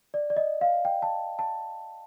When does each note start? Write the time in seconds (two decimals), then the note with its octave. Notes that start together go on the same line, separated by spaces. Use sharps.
0.14 D5
0.30 D5
0.36 D#5
0.61 F5
0.85 G5
1.02 A5
1.39 A5